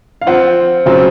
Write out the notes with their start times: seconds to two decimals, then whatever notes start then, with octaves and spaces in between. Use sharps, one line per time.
0.21 F5
0.27 F3 C4 F4 F#5
0.86 C#3 F#3 C4 F4